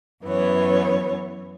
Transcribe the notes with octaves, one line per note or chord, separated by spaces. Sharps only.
F#2 E3 B3 C#5